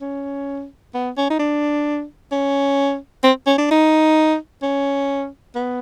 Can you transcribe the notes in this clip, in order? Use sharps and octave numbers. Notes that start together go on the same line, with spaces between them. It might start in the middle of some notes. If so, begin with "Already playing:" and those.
C#4
B3
C#4
D#4
D4
C#4
C4
C#4
D4
D#4
C#4
B3